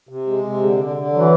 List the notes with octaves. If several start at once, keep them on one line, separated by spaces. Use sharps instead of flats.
C3
G#3
C3
D3
D3
D3
E3 F#3